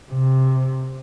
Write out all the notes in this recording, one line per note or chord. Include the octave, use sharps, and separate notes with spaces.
C3